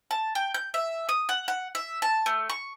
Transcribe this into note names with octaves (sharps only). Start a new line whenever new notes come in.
A5
G5
G6
E5
D#6
F#5
F#5
E5
A5
A3
C#6